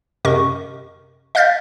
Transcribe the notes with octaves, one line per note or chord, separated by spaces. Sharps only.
F#2 C3 A#4 D#5 C#6
D#5 F5 F6 G6 A6 B6